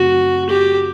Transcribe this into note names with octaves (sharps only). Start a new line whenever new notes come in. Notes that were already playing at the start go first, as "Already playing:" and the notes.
Already playing: F#2 C#3 F#3 A3 C4 F#4
G4